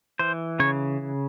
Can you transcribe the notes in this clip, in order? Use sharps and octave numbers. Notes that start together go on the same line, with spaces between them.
E3 C5
C#3 C#5